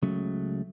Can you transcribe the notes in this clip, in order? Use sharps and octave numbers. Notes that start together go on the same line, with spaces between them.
C#2 C#3 F#3 A3